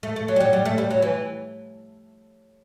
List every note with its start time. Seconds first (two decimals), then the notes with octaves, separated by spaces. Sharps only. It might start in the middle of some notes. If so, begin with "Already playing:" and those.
0.03 A3
0.16 A3
0.28 F#3
0.36 G3
0.40 F#3
0.53 G3
0.65 A3
0.78 G3
0.91 F#3
1.02 E3